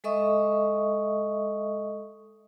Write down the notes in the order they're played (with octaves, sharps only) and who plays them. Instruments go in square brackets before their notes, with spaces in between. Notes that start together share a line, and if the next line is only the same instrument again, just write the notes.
[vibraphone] G#3 A4 D#5 E5 C#6 D#6